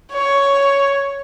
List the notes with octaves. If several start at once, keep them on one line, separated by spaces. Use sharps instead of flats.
C#5